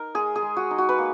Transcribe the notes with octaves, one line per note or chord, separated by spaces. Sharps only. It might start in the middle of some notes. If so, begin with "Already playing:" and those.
Already playing: D#4 A#4
G#3 G#4
G#4
G#3
F#4
D#4
F#4
B4
A#3